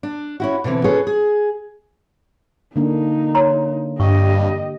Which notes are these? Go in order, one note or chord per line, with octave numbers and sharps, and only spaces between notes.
D4
C#4 E4 F#4
B2 D3 E3 C4
C#4 F4 G#4 A4 B4 C#5
G#4
D3 A#3 D4 D#4
C#5 A#5 C6
G2 G4 D#5 C#6